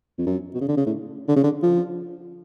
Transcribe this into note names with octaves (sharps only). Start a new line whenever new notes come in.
F2
F#2
B2
C#3
D3
C#3
A2
D3
C#3
D3
F3